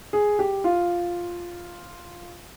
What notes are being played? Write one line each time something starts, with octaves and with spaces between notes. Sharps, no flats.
G#4
G4
F4